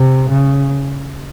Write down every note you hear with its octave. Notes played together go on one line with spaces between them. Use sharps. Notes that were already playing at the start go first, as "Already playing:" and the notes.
Already playing: C3
C#3